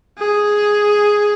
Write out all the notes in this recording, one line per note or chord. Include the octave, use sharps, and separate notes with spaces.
G#4